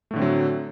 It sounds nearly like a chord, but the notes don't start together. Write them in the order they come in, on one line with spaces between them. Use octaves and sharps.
A3 A2 D3 C4 F#3